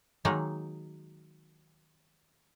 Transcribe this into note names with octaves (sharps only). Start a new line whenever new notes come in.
D#3 F#3 G#3 A#3 D#4